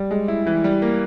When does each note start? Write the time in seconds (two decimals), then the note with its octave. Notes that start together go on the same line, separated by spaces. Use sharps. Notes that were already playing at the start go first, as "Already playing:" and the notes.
Already playing: G3
0.11 G#3
0.28 E4
0.47 E3
0.64 G3
0.82 A#3